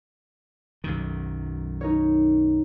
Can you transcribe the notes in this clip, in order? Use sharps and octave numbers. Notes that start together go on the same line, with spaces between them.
B1 F#2 D#3
D#4 A#4 C#5